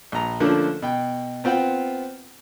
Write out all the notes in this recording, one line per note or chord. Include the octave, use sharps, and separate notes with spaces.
A#1 A#5
D3 F3 A3 A#3 C#4 D4
B2 G5
B3 C4 F4 F#5 G5